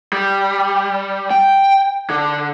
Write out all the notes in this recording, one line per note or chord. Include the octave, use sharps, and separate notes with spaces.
G3
G5
D3